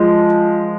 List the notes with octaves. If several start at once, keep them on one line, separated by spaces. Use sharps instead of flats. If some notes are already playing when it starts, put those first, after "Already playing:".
Already playing: F3 G#3